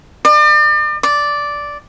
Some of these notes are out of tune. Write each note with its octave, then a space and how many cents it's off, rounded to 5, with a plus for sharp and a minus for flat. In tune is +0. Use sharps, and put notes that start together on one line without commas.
D5 +40
D5 -5